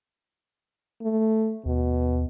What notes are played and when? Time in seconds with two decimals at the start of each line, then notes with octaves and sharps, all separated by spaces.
1.02 A3
1.66 D#2 B2